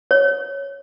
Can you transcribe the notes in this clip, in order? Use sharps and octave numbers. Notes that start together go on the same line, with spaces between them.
C#5